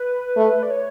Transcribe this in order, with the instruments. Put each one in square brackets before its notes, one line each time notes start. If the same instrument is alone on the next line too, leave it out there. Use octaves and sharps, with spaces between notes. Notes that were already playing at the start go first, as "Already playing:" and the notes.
Already playing: [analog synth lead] B4
[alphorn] A3
[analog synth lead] D5
C#5